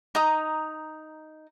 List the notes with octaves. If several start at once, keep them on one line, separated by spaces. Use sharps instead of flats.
D#4 A#5 D#6